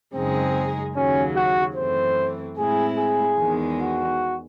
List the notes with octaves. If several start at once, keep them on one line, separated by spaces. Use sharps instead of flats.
F#2 C#3 G#3 C4 D#4 G#4
D#2 C#3 F#3 C#4
F#4
F#2 E3 A3 C4 C5
A2 G#3 C4 E4 G#4
G#4
E2 D#3 G#3
F#4